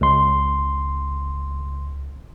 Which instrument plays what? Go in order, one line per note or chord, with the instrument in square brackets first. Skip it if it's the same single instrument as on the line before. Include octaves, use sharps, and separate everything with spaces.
[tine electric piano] C#2 C6